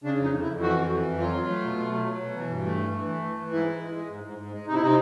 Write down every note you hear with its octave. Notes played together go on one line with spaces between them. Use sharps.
C#3 D4
F2
D#4
F2
E4
F2
E3 F#4
F2
E3
F2
F#3 F4
F#3
A3
B2
A3
F#3
F#3
B2
E3
G2
A3
E3
E3
A3
E3
E3
G#2 E4
G#3
G#3
G#3
G#2
G#2
G#2
G#3
C3 D#4
E4
C3 D#4